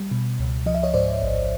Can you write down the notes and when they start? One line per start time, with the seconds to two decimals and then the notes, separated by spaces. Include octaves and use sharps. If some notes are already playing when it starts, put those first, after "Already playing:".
Already playing: G3
0.11 B2
0.39 C#2
0.66 F3 D#5
0.74 E5
0.83 C#5 D#5
0.94 G#2 C5 D5
1.22 A1